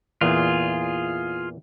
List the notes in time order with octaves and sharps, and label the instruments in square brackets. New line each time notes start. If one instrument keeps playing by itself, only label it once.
[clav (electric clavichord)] E2 A#2 E3 [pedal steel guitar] F4 G#4